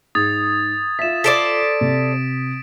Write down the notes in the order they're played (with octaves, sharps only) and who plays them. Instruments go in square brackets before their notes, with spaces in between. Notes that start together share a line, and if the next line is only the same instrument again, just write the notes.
[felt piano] G#2 [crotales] D#6 G#6 A6
[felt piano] F4 E5 [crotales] B6 E7
[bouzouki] A4 C5 D5 [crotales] B6 D7
[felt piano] C3